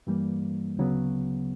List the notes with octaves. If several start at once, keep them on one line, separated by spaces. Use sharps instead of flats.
G2 E3 G3 A#3
D2 C#3 F#3 B3